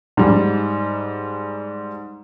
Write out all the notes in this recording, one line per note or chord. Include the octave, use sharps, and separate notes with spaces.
G#2 G3